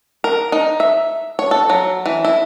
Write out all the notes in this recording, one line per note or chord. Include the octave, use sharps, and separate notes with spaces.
A#4
D#4
E5
C#5
A4
F#3
E3
E4